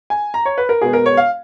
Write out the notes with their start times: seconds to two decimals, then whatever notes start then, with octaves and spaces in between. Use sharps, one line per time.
0.10 G#5
0.34 A#5
0.45 C#5
0.58 B4
0.69 A#4
0.81 B2 G#3 B3 G#4
0.93 A#4
1.06 C#5
1.17 F5